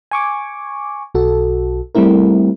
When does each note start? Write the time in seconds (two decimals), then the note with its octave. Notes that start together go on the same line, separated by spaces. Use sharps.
0.11 G#5 C#6 D6
1.15 B1 F#4 A4
1.95 G3 A3 C4 E4 A#4